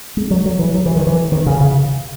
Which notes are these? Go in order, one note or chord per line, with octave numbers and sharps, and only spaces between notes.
G#3
F#3
F#3
E3
F#3
E3
D#3
E3
D#3
C#3
C#3